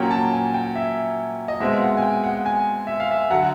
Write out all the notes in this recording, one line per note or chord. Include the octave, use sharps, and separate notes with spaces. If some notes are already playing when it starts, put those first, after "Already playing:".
Already playing: A#2 F#3 A#3 C#4 G5
A5
G#5
G5
E5
D#5
B2 G#3 C4 E5
F5
F#5
G#5
G5
F#5
G#5
E5
F5
E5
D3 F#3 F#5